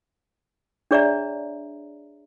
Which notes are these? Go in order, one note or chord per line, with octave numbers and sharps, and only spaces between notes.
D4 G#4 C#5 D5 E5 A#5